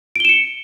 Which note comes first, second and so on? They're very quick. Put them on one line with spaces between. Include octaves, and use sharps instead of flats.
D7 G7 E7 C#7